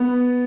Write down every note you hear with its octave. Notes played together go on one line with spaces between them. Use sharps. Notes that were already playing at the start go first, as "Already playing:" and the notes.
Already playing: B3